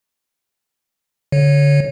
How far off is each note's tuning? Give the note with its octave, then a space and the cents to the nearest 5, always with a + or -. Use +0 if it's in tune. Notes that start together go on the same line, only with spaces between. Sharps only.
D3 -25 C#5 +0